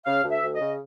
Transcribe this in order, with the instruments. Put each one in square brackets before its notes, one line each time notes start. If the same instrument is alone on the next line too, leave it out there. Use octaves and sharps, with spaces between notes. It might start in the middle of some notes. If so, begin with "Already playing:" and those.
[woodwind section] C#3 F5
D2
E5
D2
D#5
C#3